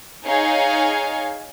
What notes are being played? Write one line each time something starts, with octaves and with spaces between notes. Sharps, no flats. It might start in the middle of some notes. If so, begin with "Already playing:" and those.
D#4 G#4 C#5 F5 G#5